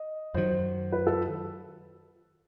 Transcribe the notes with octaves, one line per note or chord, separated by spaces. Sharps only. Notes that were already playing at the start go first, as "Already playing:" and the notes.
Already playing: D#5
F#2 D#3 F#3 C5
B4
A4